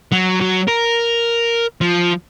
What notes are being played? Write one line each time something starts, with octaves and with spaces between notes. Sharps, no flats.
F#3
F#3
A#4
F3